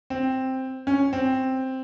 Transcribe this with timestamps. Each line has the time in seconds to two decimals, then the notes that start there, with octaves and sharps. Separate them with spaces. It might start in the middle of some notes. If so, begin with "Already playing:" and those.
0.10 C4
0.87 C#4
1.13 C4